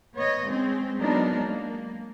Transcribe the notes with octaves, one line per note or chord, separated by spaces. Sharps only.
B3 C#5 D#5
G#3 C4 C#4
F#3 G#3 B3 D4 D#4 A#4
A#3